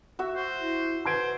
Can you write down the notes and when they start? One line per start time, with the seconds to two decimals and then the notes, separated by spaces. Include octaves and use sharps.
0.19 F#4 E5
0.36 C5
0.60 E4
1.05 B4 C5 C6 G#6 D7